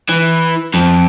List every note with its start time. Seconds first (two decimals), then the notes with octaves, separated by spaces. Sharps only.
0.09 E3
0.74 F2